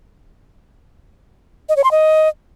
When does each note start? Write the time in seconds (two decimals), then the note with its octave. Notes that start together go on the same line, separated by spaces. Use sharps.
1.69 D#5
1.76 C#5
1.84 C6
1.91 D#5